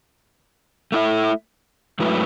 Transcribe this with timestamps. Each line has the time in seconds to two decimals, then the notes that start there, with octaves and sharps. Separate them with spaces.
0.92 A3 E4 A4 E5
1.99 G#2 F#3 A3 E4 B4